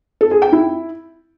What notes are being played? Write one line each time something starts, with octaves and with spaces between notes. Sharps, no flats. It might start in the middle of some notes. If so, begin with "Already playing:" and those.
A4
G#4
G5
E4